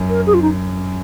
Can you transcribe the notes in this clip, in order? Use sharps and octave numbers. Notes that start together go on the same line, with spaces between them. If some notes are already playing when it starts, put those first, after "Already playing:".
Already playing: F#2
A#4
G#4
F4
D#4